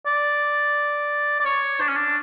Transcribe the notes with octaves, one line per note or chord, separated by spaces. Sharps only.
D5
D5
C#5
D4
C#4
D4